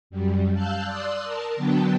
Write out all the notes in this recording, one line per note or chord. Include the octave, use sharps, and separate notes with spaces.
F#2 G3
F5 A5 E6 F#6 G6
D5 C6 D#6 E6 F#6
A#4 A5
D3 F#3 B3 D4 G5 A5